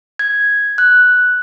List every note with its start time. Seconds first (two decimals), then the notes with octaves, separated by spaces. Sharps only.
0.19 G#6
0.78 F#6